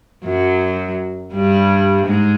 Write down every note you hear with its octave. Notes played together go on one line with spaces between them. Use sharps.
F#2 F#3
G2 G3
G#2 G#3